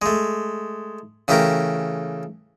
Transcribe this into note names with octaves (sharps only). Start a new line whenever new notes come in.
G#3 A3
C#3 E3 A3 G4 A#4